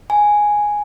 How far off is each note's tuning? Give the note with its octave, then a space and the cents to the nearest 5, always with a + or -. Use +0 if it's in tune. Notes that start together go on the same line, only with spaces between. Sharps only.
G#5 +0